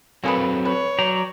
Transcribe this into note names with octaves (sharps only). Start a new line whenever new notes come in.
F#3 A#3 C4 G#4 A4 B4
B4 C#5
F#3 D5 G5 A#5